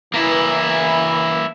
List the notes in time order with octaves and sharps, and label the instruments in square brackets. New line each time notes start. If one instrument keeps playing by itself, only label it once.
[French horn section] E3 [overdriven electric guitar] A#3 E4